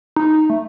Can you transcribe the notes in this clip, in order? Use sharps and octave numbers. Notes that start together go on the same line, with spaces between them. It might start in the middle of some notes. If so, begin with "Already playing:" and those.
D#4
A3